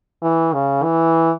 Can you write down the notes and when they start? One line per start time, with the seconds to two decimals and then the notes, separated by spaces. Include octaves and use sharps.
0.22 E3
0.53 C#3
0.83 E3